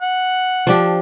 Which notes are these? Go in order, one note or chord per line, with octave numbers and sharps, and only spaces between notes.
F#5
F3 D4 G4